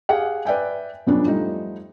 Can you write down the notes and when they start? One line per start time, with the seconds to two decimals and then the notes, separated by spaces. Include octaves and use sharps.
0.09 G4 G#4 F5 F#5
0.45 B4 D5 E5 G5 G#5
1.07 F2 F#3 B3 C#4 D4
1.27 F3 G3 A3 D#4